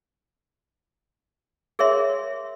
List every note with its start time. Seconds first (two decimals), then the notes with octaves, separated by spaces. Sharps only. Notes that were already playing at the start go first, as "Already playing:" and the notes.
1.79 G#4 A#4 C#5 E5 C6